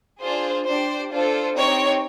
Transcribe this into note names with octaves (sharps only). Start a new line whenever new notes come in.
D4 F4 G#4 C5
D4 G4 C5
D4 F4 A4 C5
C4 D#4 G4 C#5